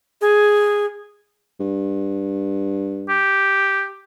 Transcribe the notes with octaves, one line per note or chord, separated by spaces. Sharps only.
G#4
G2
G4